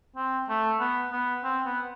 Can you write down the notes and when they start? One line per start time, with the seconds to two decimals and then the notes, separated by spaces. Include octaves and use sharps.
0.16 C4
0.49 A3
0.80 B3
1.12 B3
1.44 C4
1.66 B3